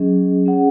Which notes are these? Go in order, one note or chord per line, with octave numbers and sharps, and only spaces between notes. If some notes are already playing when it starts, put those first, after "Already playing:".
Already playing: F#3 C#4 G#4 D#5
C#4 G#4 C#5 F#5